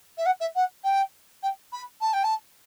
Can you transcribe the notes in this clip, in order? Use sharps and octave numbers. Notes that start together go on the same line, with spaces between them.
E5
F#5
E5
F#5
G5
G5
B5
A5
G5
A5